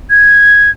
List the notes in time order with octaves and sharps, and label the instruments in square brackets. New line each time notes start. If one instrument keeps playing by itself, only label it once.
[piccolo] G#6